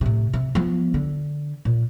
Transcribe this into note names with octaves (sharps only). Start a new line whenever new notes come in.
A2 C3
C3
F3 B3
D3
A#2